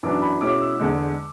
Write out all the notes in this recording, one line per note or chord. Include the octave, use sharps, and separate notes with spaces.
F#2 E3 B3 D4 D6
B5
B2 G#3 C#4 E4 D6
E6
E2 D3 G#3